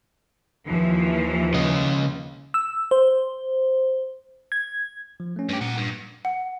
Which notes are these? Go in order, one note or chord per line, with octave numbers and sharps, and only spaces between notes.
D#2 E3 F3
C#3 D#5
E6
C5
G#6
F3
A3 C#4
G2 G4
A#2 A#4 F#5
G2
F#5